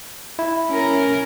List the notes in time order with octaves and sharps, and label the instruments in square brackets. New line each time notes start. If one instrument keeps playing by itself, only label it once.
[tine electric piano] E4
[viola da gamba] C#4 A#4